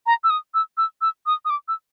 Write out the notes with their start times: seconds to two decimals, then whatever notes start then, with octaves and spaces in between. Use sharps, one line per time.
0.06 A#5
0.24 E6
0.30 D#6
0.54 E6
0.77 E6
1.01 E6
1.26 D#6
1.45 D#6
1.50 D6
1.68 E6